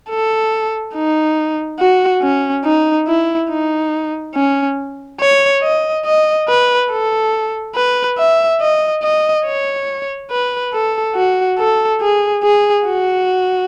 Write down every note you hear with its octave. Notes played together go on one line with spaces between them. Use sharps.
A4
D#4
F#4
C#4
D#4
E4
D#4
C#4
C#5
D#5
D#5
B4
A4
B4
E5
D#5
D#5
C#5
B4
A4
F#4
A4
G#4
G#4
F#4